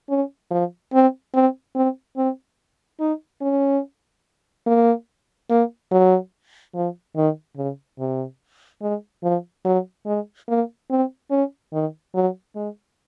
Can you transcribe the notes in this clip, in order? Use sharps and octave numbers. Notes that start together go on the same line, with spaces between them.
C#4
F3
C4
C4
C4
C4
D#4
C#4
A#3
A#3
F#3
F3
D#3
C#3
C3
G#3
F3
F#3
G#3
A#3
C4
C#4
D#3
F#3
G#3